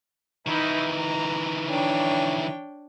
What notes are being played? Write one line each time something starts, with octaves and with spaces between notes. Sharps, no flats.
D#3 E3 D#4 E4
A#5
D4 C#5 G5